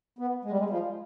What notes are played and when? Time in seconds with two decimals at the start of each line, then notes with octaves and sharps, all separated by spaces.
0.19 B3
0.45 G#3
0.51 G3
0.59 G#3
0.70 F3